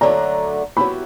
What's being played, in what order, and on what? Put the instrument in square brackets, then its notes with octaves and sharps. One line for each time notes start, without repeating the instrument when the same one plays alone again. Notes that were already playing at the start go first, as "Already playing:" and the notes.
[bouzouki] D3 F#3 A3 D4 [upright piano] A#5
[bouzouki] F#3 B3 E4 G4 [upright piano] B5